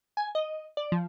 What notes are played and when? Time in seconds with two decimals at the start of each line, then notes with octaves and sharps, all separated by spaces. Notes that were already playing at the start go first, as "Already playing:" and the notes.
0.17 G#5
0.35 D#5
0.77 D5
0.92 F3